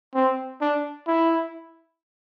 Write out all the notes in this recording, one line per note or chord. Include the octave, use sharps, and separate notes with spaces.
C4
D4
E4